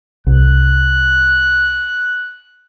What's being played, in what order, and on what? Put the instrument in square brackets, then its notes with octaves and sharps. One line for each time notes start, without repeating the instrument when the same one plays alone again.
[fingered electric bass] C2 [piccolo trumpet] F#6